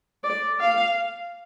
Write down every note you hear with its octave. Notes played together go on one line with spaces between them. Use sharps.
D5
F5